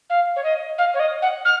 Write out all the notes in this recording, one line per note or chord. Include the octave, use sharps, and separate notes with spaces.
F5
C#5
D#5
F5
C#5
D#5
F#5
F6